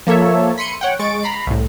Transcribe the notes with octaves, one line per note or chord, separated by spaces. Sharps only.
F3 A#3 A4 C#5 E5
B5 C6 C#7 D#7
C#5 F#5 G5
G#3 C#6 A6 D7
A#5 B5 C7
C2 A2